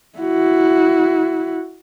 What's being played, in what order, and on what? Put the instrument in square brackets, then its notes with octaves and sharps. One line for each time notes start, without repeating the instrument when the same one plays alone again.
[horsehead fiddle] E4 F#4